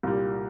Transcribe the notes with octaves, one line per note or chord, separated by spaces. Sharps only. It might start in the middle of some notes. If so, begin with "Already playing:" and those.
C2 A#2 G3